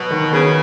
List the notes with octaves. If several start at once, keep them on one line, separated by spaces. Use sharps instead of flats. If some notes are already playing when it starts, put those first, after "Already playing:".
Already playing: B2 F#3
D#3
C#3 B3